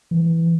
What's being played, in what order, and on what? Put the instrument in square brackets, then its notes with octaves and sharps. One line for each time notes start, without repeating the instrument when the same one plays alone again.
[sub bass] E3